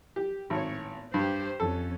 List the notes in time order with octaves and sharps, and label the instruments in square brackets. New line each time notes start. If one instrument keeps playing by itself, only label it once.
[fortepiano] G4
[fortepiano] G#1 [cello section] A2 C4 C#5
[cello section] B3
[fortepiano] G2 [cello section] G4 C5
[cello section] F2 C#4 [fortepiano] A4